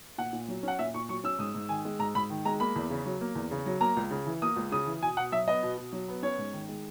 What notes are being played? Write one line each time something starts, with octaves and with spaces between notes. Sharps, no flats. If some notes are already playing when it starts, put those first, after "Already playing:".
A#2 F#5
A#2
F#3
C#4 F#5
A#2 E5
A#2 C#6
F#3 C#6
C#4 E6
G#2 D#6
G#2
D#3 G#5
G#3
G#2 A#5
G#2 B5
D#3
G#3 A#5
A#3 B5
E2
C#3
F#3
A#3
E2
C#3
F#3
A#3 A#5
C#2
C#3
E3
A#3 D#6
C#2
C#3 D#6
E3
B2 G#5
B2 F#5
F#3 E5
B3 D#5
B2
B2
F#3
B3
C#4 C#5
G#2
D#3
G#3